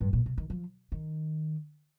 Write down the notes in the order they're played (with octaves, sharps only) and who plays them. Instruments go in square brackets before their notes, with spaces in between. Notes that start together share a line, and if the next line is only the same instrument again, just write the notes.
[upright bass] G2
A#2
C3
D#3
F3
D#3